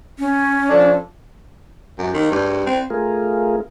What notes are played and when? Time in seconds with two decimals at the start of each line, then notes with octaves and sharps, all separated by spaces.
0.19 C#4
0.69 F3 D4 A4
1.99 F#2
2.14 D#3
2.31 G2
2.66 C4
2.90 A3 F4 G#4 A#4